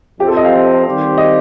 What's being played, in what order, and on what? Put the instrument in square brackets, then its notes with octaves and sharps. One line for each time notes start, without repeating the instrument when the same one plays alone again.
[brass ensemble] F2 C3 F3 C4 [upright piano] G4
[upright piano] A4
D#5
F5
[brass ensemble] D#3 G3 C4 G4 C5
[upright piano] D#5